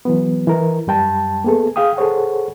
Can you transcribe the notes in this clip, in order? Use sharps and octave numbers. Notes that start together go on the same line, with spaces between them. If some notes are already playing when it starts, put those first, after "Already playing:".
E3 F#3 B3
E3 A#4
F#2 G3 G5 A5
A#3 B3 G#4 A4
G#4 F5 G5 D#6
G#4 A4 C5 C#5 F#5